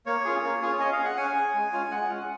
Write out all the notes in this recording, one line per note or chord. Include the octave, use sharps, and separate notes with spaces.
A#3 C#5
C#4 F4 G#4
A#3
C#4 F4 G#4
C#4 D#5
F5
G#4
F#5
C#4 G#5
G#4
G#3
C#4 F4
G#3 F#5
C#4 F4